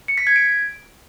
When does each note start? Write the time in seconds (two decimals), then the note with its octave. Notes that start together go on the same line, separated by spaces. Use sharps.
0.08 C#7
0.18 B6
0.27 G#6
0.36 D7